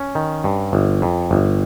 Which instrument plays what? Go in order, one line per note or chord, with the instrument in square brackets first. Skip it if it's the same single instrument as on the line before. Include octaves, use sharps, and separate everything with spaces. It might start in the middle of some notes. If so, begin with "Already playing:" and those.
Already playing: [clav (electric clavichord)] C#4
D#3
G2
G1
F2
G1